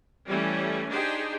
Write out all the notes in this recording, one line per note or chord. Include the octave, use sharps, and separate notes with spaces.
E3 G3 A3 C#4
D4 D#4 G4 G#4 C5 G5